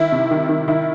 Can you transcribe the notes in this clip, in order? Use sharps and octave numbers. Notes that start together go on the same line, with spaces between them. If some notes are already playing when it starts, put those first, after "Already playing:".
Already playing: D#3 E4
C3
D#3
D#3
D#3 E4